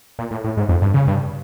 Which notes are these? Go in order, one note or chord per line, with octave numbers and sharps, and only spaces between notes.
A#2
A2
A2
G#2
F2
G2
C#3
G2